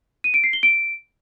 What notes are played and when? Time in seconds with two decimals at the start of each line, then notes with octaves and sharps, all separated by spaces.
0.24 D#7
0.34 D7
0.44 C7
0.53 G7
0.63 D7